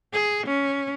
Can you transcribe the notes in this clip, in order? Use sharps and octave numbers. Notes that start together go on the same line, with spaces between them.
G#4
C#4